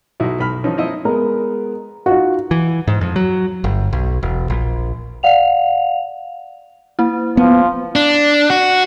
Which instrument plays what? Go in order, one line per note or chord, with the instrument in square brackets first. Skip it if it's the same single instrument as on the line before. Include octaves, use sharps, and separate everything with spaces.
[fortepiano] B1 D#4 E4 F#4
B1 B5 F6
E3 F3 C#4 D#4
F3 D#4 E4 D#5 E6
[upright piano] G#3 B3 A#4
[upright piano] D#4 F4 [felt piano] F#4
[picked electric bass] E3
G#2
F2
F#3
G1
B1
E1
A#1
[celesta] D5 F5 F#5 F7
[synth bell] A#3 E4
[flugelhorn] F3 [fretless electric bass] B3
[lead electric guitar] D4
F#4